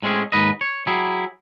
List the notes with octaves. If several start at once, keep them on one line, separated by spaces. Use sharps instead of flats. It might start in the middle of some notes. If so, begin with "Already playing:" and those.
A2 G#3 C4 C#4 G#4
D#2 G#2 B4 D#5
C#5
F#3 E4 G4 G#4